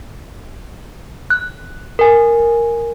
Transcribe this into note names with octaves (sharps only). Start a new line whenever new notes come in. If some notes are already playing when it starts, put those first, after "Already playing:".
F#6
A#4 G#5